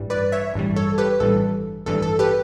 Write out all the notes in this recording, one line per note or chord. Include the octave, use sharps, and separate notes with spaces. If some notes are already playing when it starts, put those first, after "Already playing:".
Already playing: A1 G2 E3 G3
B4 D5
C#5 E5
A1 G2 E3 G3
A4 C#5
G4 B4
A1 G2 E3 G3 A4
A1 G2 E3 G3 A4
A4
G4 B4